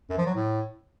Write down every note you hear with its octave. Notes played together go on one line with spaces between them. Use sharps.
F#2
F3
F#3
A2